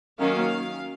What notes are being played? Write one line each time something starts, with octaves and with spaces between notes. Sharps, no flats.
D#3 F#3 A#3 C#4 F5